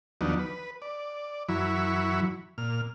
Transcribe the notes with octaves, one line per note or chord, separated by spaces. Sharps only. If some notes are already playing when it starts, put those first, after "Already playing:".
D#2 F3 F#3 B3 D4 D#4
B4
D5
F#2 E3 F#3 E4 B5 C#6
A#2 F6